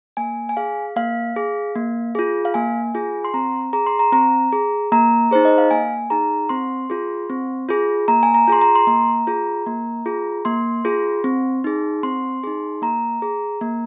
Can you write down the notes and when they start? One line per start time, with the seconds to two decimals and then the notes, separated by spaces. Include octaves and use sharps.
0.17 A#3 G#5
0.49 G#5
0.57 G#4 F5
0.96 A#3 F5
1.36 G#4
1.75 A#3
2.15 F4 G#4
2.45 F5
2.54 A#3 G#5
2.95 F4 G#4
3.24 C6
3.34 C4 A#5
3.73 G#4 A#5
3.87 C6
3.99 A#5
4.12 C4 A#5
4.52 G#4
4.92 A#3 A#5
5.31 D#4 G#4 C5
5.45 D#5
5.58 F5
5.71 A#3 G#5
6.10 D#4 G#4 A#5
6.49 C4 C6
6.90 F4 G#4
7.30 C4
7.69 F4 G#4
8.08 A#3 A#5
8.23 G#5
8.34 A#5
8.48 F4 G#4 C6
8.61 A#5
8.76 C6
8.87 A#3 A#5
9.27 F4 G#4
9.66 A#3
10.06 F4 G#4
10.45 A#3 C6
10.85 F4 G#4
11.24 C4
11.64 D#4 G#4
12.03 C4 C6
12.44 D#4 G#4
12.82 A#3 A#5
13.22 G#4
13.61 A#3